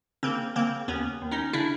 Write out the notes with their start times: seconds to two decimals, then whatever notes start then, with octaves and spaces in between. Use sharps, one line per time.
0.23 C#3 A#3 C4
0.56 C#3 A#3 C4
0.88 D#2 B3 C#4
1.22 D#2
1.31 C#4 D#4
1.53 C#3 D4 E4